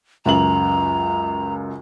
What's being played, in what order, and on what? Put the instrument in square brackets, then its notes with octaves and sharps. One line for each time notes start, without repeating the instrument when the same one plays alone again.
[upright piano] C#2 F#2 F#7 [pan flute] A#5